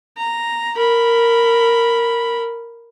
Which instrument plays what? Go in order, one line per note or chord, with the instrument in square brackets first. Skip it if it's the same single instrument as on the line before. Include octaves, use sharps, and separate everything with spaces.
[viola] A#5
A#4 B5